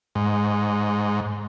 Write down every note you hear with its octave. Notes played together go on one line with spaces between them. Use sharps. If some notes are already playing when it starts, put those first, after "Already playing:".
G#2